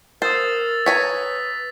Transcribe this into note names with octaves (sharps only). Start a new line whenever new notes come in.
A#4 C5 D#6 E6 A6
B4 C#5 G#5 A#5 B6